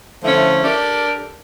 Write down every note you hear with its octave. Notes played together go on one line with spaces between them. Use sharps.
D3 F3 A3 C#4 E4
D4 G4 A4 A#4 D5